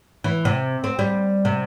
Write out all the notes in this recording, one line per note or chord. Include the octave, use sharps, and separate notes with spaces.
E3
C3
C4
G3
C3